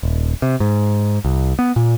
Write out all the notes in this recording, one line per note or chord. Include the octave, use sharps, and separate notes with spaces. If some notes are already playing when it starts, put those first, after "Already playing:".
D#1
C3
G#2
C2
B3
A#2